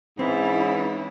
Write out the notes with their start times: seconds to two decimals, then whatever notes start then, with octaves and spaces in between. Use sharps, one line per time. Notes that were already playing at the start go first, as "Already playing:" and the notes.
0.19 G#2 E3 C4 C#4 E4